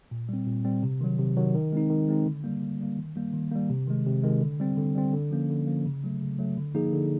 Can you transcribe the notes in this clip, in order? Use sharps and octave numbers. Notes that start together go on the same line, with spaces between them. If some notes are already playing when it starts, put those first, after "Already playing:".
A#2
G3 C4
A#2
G3 C4
C3
D#3 F#3
C3
D#3 F#3
D#3
G#3 C4 D#4
D#3
G#3 C4 D#4
D3
G3 A#3
D3
G3 A#3
D#3
G3 A#3
D#3
G3 A#3
C3
D#3 G#3
C3
D#3 G#3
D3
G3 C4
D3
G3 C4
D3
F3 A#3 C#4
D3
F3 A#3 C#4
C#3
F#3 A3
C#3
F#3 A3
D3
F3 A#3 D#4 G#4
D3